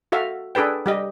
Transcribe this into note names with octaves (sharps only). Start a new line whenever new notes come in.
F#4 A4 E5 F5
D4 G#4 A4 B4 G5
G3 G4 D#5